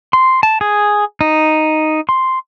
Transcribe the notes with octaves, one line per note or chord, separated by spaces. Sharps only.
C6
A5
G#4
D#4
C6